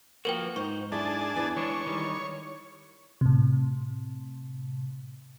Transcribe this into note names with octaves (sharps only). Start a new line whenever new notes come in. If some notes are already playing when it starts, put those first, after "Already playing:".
F3 A#3 F#4 A#4 B4 G5
G#2 D#4 C5 C#6
D4 E4 G#4 A4 A5
E2 E4 B4 G#5
E3 G#3 D4 C#5
D#3 G3
A2 C3